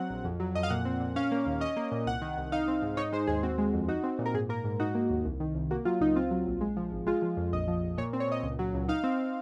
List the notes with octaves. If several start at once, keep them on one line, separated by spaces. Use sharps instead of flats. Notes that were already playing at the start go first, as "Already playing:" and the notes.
Already playing: F#3 C4 F#5
A#1
F2
F#3
F2 D#5
F5
A#2 F#5
C4
A#2
C#4 F5
A#3
D#2
C#4 D#5
A#3
A#2
C2 F#5
D#3
C2
D#4 F5
C4
G#2
D#4 C#5
G#3 C5
D#2 G#4
C4 F#4
G#3
F2
D#4 F#4
C4
A#2
A#4
G#2 G#4
A#3 A#4
G#2
D#4 F#4
A#3
D#2
C2
D#3
C2
A#3 F#4
F#3 F4
C#2 D#4
C4 F4
F#3
A#1
G#3
F3
G#1
G#3 F4
F3
F2
A#1 D#5
F3
A#1
A#2 C#5
C4
C#5
A#2 D#5
C#2
F#3
C#2
D#4 F5
C4